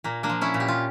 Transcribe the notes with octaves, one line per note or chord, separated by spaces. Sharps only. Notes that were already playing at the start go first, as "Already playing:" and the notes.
A#2 A#3
A#3 D4
F3
C#4 E4
A#2
G4
F4